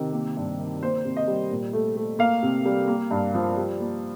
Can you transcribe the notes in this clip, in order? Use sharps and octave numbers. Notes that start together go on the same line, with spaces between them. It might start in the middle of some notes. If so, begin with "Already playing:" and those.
Already playing: C3 D#3
A#3
G2
D#3
A#3 C5
C3
D#5
G3
A#2
A3
A3
A#3 F5
C3
G3
A#3
G2
F3
G3
A#3